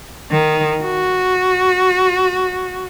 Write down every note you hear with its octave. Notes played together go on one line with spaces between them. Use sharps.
D#3
F#4